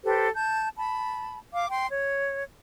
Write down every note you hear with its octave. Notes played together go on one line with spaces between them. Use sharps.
G4 A4 B4 C5
A5 G6
A5 B5
F5 D6
G5 C6
C#5